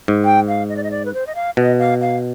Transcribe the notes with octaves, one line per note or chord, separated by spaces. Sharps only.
G#2
G5
F5
D#5
D5
D#5
D5
B4
C5
D#5
F5
B2 D#5
F5
F5